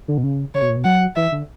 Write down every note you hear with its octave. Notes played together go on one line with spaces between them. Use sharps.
D3
B2
C#3
C#3 C#5
B2
A#2
B2
F#3 F#5
E3 E5
D3